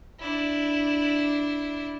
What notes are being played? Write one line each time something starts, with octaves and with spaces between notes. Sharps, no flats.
D4 E4